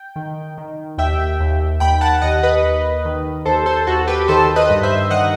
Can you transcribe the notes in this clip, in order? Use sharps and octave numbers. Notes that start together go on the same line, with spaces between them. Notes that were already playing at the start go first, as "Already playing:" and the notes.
Already playing: G5
D#3
D#3
D#2 E5 G5
D#2
D#2 G5 B5
F#5 A5
D#2 D#5 F#5
B4 D#5
D#2
D#3
D#2 A4 C5
A4 C5
D#2 F#4 A4
G4 B4
D#3 A4 C5
B4 D#5
G2
C5 E5
D#3 D#5 F#5